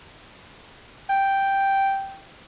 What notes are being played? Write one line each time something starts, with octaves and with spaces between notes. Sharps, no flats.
G5